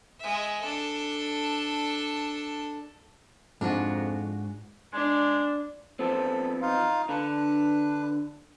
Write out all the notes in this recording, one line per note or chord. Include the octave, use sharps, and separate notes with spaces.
G#3 E5
D4 A4
F2 G#2 D4 F4 F#4
G#3 D4
F3 B3 C4 A4
D#4 F4 F5
D3 D4 B4